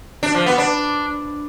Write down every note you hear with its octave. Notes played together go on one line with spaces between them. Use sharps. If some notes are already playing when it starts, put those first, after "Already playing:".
D4
F3
B3
D4